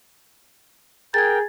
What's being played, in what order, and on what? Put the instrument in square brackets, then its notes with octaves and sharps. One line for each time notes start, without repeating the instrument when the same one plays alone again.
[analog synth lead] G#4 [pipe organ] A#4 G5 [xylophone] G#6 A6